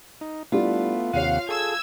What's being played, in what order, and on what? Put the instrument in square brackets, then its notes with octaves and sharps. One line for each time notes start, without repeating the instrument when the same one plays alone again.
[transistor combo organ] D#4
[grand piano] G3 D4 E4 [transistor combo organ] A3 B3 [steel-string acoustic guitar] F4
[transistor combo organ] D#2 C3 F#5 [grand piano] C#5 D#7 [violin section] F5
[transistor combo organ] G#4 A4 [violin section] E6 G#6